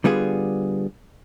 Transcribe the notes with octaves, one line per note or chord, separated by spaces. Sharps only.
D3 G3 B3 F4 G#4